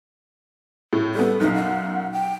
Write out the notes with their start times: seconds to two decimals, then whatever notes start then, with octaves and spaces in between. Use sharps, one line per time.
0.93 A2
1.15 G3 B3 A4
1.40 B1 F#2 D#4
1.55 F#5
2.12 G5